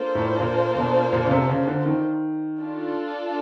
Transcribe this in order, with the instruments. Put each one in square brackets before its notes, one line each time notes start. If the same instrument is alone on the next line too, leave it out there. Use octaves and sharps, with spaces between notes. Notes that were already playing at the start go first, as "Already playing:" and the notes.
Already playing: [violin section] A#3 D4 F4 A4 C5
[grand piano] A2
A#2
B2
A#2
C#3
C3
C#3
D3
D#3
[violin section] D4 F4 A4